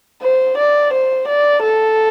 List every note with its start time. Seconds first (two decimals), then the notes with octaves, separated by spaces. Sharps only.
0.22 C5
0.58 D5
0.93 C5
1.28 D5
1.63 A4